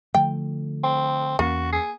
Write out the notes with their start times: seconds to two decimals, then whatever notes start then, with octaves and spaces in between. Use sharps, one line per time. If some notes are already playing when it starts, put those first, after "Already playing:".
0.15 D3 F3 A3 G5
0.83 C4
1.39 E2 A#3 C4 C#4 F#4
1.73 G#4